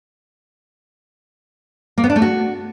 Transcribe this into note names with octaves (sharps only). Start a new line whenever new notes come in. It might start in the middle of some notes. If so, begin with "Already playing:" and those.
A#3
B3
D4
A3
F#4